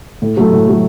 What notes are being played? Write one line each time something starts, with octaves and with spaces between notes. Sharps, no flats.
A2
F#3 A3
A2
F#3 A3